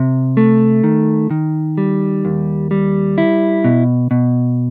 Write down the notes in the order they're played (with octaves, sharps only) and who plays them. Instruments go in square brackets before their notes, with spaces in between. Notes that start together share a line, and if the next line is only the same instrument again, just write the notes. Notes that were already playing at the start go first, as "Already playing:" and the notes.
Already playing: [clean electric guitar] C3
A3
D#3
D#3
G3
D#2
G3
E4
B2
B2